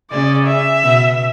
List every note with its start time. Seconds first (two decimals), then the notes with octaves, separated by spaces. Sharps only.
0.11 C#3 D5
0.47 E5
0.83 B2